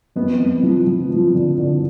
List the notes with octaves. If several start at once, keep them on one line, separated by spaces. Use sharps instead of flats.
F2 B3
F2
F3
F3
F3
D3
D3